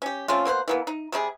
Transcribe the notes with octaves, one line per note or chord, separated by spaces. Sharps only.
C#4 G4
A3 C4 C#4 F4
B2 A#3 C5 F#5
E3 A#3 B3
D#4
C3 G3 D#4 G#4